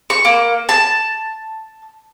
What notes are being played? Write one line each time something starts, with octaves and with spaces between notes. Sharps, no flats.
C#6
A#3
A5